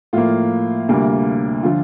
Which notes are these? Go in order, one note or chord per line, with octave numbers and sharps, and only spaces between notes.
A2 F3 A#3 F4
D2 C3 G3 A#3
D3 F3 F4